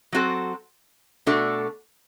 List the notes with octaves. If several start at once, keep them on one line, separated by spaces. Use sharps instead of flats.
F#3 C4 F#4 A4
B2 A3 D4 F#4 A4